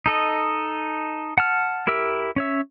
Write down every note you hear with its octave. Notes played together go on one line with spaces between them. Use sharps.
D#4 A4 D#5
F#5 A5 F6
E4 G4 A#4 E5 E6
C#4 C#5 E5